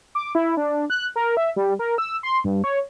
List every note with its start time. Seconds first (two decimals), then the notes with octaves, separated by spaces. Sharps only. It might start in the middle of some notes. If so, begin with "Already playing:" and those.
0.15 D6
0.35 E4
0.57 D4
0.90 F#6
1.16 A#4
1.37 E5
1.56 G3
1.79 A#4
1.98 E6
2.23 C6
2.44 G2
2.64 C#5